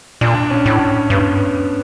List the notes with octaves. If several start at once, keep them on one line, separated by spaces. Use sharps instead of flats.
A#2 D4
C#4
A2
G2 B3